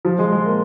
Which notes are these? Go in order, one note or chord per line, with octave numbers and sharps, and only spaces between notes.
F3
G#3
G#3
A#3